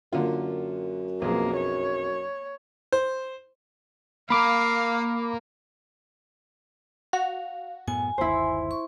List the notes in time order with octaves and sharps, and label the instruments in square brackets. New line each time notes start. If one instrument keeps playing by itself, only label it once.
[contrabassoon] F#2 [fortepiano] D3 A#3 F4
[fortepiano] B1 F2 G#4 [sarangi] A#3
[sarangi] C#5
[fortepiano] C5
[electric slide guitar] A#3 A#4 [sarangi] F5 [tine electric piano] B5 D6
[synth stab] F#4 [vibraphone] F5
[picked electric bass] F#2 A2 B3 [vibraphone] G#5
[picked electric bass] G1 D#2 [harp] E4 C5
[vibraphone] C#6